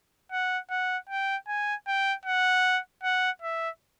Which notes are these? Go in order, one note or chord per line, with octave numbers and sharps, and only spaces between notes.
F#5
F#5
G5
G#5
G5
F#5
F#5
E5